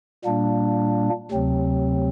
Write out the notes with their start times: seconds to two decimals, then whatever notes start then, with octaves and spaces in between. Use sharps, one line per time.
0.24 A#2 G3 A#3 D4
1.31 D2 C3 F#3 C4